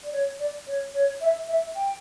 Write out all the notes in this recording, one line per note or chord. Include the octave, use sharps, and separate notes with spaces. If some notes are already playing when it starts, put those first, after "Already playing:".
D5
C#5
D5
C#5
C#5
E5
E5
G5